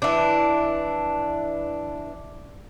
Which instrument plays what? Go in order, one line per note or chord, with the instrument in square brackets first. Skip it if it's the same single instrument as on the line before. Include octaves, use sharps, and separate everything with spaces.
[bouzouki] E3 D4